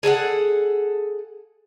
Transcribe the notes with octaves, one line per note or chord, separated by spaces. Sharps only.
G#4 A4 D5 F#5